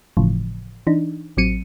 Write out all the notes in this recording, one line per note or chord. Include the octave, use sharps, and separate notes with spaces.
G1 A2 C#3 E3 F3
E3 D4 D#4
A1 F#3 C4 C#7 D#7